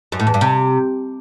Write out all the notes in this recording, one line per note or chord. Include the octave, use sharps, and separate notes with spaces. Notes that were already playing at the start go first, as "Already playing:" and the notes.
F#2
A2
E2
G2
C3